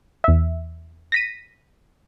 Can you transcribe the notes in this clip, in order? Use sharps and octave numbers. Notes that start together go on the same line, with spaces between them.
E2 E5
A#6 B6 D#7